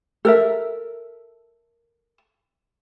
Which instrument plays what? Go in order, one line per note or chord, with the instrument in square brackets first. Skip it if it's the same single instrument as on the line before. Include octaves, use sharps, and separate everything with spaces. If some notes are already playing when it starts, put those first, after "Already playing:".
[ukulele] A4 A#4 E5